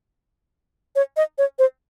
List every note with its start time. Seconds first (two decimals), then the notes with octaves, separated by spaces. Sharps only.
0.96 C#5
1.17 D#5
1.38 C#5
1.59 C5